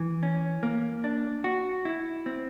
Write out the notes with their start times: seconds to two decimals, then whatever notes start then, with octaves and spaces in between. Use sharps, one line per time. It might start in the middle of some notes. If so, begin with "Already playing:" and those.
Already playing: E3
0.23 C#4
0.63 A#3
1.04 D4
1.44 F#4
1.85 E4
2.26 C4